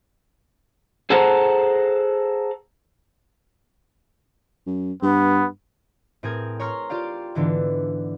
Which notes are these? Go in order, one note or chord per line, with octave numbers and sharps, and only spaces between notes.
G#4 A4 C5 F#5 A5 A#5
F#2
G2 B3
A2 C4 G#4 A#4 G#6
C#5 A#5 C6 F6 C#7
F4 G4 D5 F5
G#2 D3 E3 B3 D4